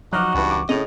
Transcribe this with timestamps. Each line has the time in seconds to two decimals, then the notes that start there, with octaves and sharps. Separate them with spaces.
0.13 F3 F#3 D#4 F#4 D6 F6 F#6
0.35 C#2 G2 E3
0.51 D6
0.69 A2 C#3 C#4 D#5 F7